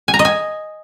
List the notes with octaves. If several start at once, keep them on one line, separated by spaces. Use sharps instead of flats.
G#5
A#5
D#5
G#5